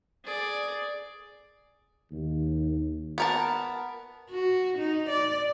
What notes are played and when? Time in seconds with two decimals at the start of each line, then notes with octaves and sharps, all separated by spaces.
0.24 G#4 D5
2.11 D#2
3.18 B3 A#4 A5
4.30 F#4
4.78 D#4
5.09 D5